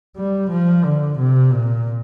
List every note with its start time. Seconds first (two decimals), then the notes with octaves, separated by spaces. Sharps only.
0.17 G3
0.50 F3
0.85 D3
1.18 C3
1.52 A#2